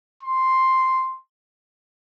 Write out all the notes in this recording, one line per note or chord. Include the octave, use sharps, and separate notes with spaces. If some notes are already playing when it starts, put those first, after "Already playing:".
C6